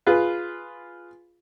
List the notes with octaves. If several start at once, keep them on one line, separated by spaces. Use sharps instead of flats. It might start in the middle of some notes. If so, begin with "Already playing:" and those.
F4 G#4 B4